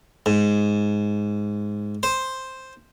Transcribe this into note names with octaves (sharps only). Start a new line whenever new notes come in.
G#2
C5